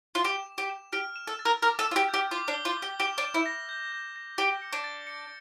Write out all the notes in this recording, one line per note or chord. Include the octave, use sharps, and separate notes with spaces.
F4
G4 E7
E7
G4
E7
G4 F6
E7
A4
A6
A#4
A#4 D6
A4
D6
F4
G4
G6
G4
F4 D6
D4
G7
F4
D6
G4
G4 E7
D4
E7
E4
A#6
G6
G6
A#6
G4 G7
C#7
D4
A6
C#7